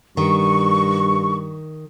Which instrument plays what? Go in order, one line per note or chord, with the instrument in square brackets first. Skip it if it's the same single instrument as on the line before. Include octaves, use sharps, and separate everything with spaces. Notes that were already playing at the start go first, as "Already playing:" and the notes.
[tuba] G2 [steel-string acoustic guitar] D#3 [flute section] C#6